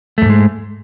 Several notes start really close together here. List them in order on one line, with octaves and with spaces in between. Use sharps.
A3 F2 G#2 G#3